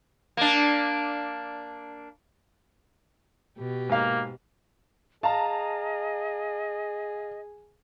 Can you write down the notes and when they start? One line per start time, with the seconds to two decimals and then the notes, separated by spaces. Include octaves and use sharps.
0.37 A#3 D4
3.58 B2 G4
3.89 G#2 A#3 F5
5.23 G#4 D#5 F5 A5 A#5